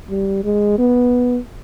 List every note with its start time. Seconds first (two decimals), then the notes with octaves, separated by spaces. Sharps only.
0.10 G3
0.44 G#3
0.78 B3